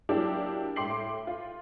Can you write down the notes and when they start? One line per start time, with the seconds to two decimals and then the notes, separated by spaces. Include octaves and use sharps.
0.09 F#3 A#3 D4 E4 G4
0.76 A2 G5 C6 D6 C7 F#7
1.27 F4